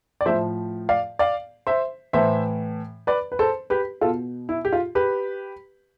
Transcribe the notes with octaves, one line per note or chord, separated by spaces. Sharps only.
D5
A2 F3 C5 E5
D5 F5
D5 F5
C5 E5
A2 E3 C5 E5
B4 D5
B4
A4 C5
G4 B4
B2 F4 A4
E4
G4
F4
G4 B4